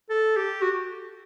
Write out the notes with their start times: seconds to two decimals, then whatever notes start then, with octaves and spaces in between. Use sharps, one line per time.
0.10 A4
0.37 G4
0.62 F#4